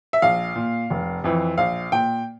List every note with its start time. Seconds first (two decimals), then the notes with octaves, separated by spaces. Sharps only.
0.13 E5
0.22 A#1 F5
0.56 A#2
0.90 F1
1.24 F2 E3
1.58 A#1 F5
1.92 A#2 G5